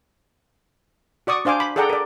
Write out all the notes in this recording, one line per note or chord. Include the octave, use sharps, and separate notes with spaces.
F#4 D5 C#6 D#6
D4 C5 F5 G#5 D6
B5
G#4 A4 D5 F#5 G5 A#5
A#4 D5